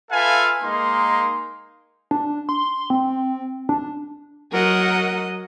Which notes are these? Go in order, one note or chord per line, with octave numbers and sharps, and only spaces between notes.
F4 A4 B4 E5 F5 G#5
G#3 A#3 D#4 A#4 C6
D4
C6
C4
D4
F#3 A#4 D#5 F#5